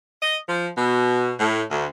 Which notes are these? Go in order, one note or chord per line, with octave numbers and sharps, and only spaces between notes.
D#5
F3
B2
A2
D2